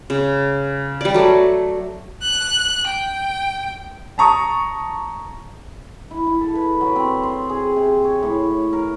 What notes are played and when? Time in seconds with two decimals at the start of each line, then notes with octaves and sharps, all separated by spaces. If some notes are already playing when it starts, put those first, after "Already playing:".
0.10 C#3
1.01 G3 D5
1.14 F#3 A3
2.21 F#6
2.88 G5
4.18 A5 A#5 C#6 D#6
6.11 E4
6.27 E4
6.41 A4
6.55 B4
6.81 F#3
6.96 C4
7.23 C6
7.49 G#4
7.76 C3
8.04 C#5
8.23 A2
8.73 A#4